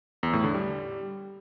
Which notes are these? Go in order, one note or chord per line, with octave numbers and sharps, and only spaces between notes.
E2
A2
D3
G3